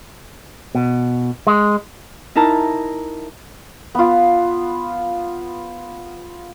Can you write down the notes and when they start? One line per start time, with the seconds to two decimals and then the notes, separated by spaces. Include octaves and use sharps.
0.75 B2
1.47 G#3
2.35 D#4 E4 A#4 A5 A#5
3.95 B3 F4